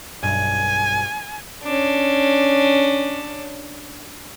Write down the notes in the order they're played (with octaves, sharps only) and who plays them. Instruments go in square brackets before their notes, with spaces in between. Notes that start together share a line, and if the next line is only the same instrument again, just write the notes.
[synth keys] B1 G2 [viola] G#5
[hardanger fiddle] C#4 D4